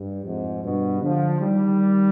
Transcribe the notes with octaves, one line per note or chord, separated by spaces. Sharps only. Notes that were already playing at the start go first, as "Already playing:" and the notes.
Already playing: G2
F2 G#2
G2 B2
D3 F3
D#3 G3